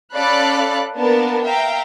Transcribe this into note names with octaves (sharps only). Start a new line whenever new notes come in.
C#4 A4 D5 F5 B5 F#6
A#3 B3 D4 A#4 A5
E5 F5 G5 A#5